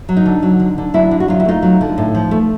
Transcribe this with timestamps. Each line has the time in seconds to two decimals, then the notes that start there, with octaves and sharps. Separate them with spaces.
0.09 F#3
0.17 D#4
0.26 D3
0.43 F#3
0.60 D3
0.78 D3
0.94 F#3 D4 E4
1.11 D3
1.20 F#4
1.28 F#3 F4
1.40 E4
1.45 A3 D#4 F4
1.63 F#3
1.81 D3
1.98 A2
2.15 F3
2.31 A3